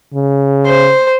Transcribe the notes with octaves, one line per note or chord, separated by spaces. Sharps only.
C#3
C5